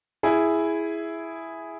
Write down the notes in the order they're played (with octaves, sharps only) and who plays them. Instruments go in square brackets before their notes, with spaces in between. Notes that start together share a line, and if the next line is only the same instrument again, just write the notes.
[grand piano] E4 G#4